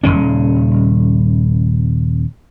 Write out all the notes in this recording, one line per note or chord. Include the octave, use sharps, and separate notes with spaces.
D#1 G#1 C#3 C#4